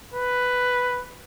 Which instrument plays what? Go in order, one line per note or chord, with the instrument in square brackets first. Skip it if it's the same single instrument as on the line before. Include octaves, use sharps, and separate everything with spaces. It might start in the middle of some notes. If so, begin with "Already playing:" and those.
[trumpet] B4